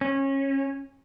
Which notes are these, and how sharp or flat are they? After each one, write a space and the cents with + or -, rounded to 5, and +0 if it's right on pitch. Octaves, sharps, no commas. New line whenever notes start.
C#4 -25